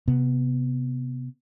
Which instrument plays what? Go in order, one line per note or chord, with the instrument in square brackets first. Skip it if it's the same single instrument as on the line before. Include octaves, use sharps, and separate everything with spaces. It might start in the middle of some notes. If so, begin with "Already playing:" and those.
[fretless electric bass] C3 B3